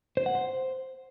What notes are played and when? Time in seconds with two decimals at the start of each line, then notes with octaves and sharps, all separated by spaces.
0.17 C5
0.26 F#5
0.35 C5